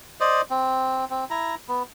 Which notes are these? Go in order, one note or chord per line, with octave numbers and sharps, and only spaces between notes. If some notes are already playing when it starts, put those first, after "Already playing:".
C5 D5 D#5
C4
C4
E4 A#5
B3